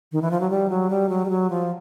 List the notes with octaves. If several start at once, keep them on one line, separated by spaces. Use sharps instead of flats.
D#3
E3
F3
F#3
G3
F#3
G3
F#3
G3
F#3
F3